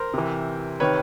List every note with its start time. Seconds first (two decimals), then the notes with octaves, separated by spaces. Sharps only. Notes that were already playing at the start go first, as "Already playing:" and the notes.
Already playing: A#4 C5
0.14 C3 E3
0.80 C3 D#3 B4 C#5